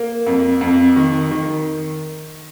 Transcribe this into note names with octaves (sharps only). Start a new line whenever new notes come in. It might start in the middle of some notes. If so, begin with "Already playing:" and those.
Already playing: A#3
F2
F2
D#3
D#3